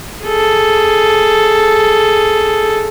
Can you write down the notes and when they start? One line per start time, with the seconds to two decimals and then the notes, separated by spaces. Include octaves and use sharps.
0.24 G#4 A4